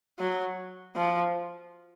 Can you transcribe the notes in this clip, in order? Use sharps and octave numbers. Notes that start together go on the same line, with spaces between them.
F#3
F3